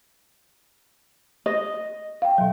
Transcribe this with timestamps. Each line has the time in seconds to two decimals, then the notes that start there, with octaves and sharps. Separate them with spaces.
1.46 D#5
2.22 F5 G5
2.38 B2 F#3